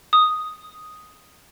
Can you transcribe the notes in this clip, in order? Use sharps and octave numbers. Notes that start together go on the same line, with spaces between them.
D#6